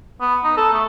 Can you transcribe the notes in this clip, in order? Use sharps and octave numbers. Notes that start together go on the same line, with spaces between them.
B3
D#4
A4
A3